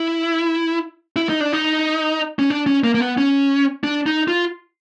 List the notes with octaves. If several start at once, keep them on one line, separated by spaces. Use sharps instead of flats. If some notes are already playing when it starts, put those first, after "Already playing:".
Already playing: E4
E4
D#4
D4
D#4
C#4
D4
C#4
A#3
A#3
B3
C#4
D4
D#4
F4